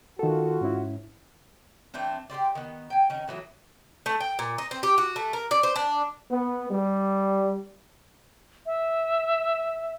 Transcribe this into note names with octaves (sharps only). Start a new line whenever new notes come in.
D#3 F4 F#4 A4
G#2 C#4 E4
E3 A3 C4 D4
G4 A#4 C5 D5
D#3 B3
G5 G#5
D#3 C#4
A2 E3 F#3 B3
A3
G5
A#2
D#4
C4
G4
F#4
A3
A#4
D5
C5
D4
B3
G3
E5